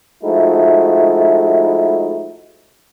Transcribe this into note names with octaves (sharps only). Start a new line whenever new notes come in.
F3 G#3 A3 D#4 E4 F#4